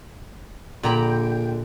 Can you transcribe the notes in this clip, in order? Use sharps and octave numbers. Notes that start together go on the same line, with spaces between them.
A#1 A#2 D3 G5 A#5 B5